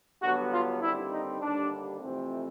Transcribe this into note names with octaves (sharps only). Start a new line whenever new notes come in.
G2 D3 F#3 B3 F#4
F4
D#2 D3 G3 C4 E4
D#4
D#2 D3 G3 D4
F2 C3 E3 A3 C4